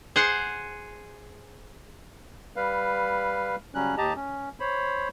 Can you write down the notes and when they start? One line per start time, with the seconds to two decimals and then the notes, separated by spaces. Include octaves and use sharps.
0.16 G#4 C5 F#5
2.56 G3 B4 F5
3.75 C#3 F#3 G3 C#4 F#6
3.98 D#2 G4 D#5 A5 A#5
4.16 C#4
4.60 C5 C#5 B5